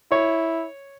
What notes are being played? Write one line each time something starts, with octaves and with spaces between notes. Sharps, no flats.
E4 C#5